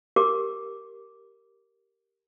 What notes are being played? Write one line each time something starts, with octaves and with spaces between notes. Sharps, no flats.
G4 A#4 D6